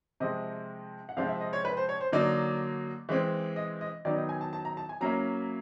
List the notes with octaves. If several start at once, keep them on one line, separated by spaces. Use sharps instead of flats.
C3 F3 G#3 D#5
F#5
C3 F3 G#3 C4 F5
E5
D#5
C#5
B4
C5
C#5
C5
D3 F#3 A#3 D#4 D5
E3 G#3 C4
D#5
D#5
D#3 F#3 B3 D#4 D5
D#5
G#5
A5
A5
A#5
A5
G#5
F#3 A#3 C#4 E4 A#5